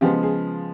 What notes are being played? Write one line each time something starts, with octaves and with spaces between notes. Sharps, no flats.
C#3 F3 G#3 B3 G4
G#4